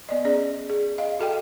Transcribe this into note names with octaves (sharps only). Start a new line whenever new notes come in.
B3 D5 D#5
C#4 G#4 D5
G#4
D#5 F5
F#4 A4 D#5 G5